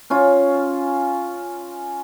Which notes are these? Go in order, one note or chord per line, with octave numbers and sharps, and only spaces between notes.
C#4 F4